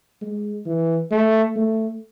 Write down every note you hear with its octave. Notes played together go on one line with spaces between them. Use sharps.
G#3
E3
A3
A3